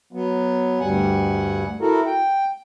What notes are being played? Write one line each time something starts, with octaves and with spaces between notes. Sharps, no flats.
F#3 B3
D2 G2 G3 F#5 G#5
E4 F#4 A4 A#4
G5